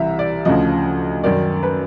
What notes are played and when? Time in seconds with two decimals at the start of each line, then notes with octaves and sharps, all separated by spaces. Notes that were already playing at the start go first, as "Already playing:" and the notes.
Already playing: C2 C3 E3 E5 A#5
0.19 D5
0.45 D2 C#3 F3 D#5
1.23 F#2 D#3 D5
1.63 B4